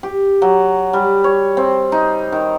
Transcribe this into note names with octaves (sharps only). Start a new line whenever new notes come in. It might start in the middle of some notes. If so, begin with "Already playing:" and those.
G4
F#3
G3
C#5
C4
D#4
D#3